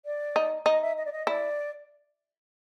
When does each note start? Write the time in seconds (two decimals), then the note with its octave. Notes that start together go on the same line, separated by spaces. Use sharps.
0.05 D5
0.36 D#4
0.66 D#4 D#5
0.81 E5
0.97 D#5
1.05 D5
1.12 D#5
1.27 E4 D5